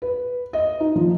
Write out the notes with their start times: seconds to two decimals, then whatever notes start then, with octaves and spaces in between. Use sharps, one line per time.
0.02 B4
0.53 D#5
0.80 D#4
0.96 F3